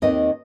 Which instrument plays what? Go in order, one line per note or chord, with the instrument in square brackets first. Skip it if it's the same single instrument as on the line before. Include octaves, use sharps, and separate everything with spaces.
[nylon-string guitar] D#2 D#3 C4 D#5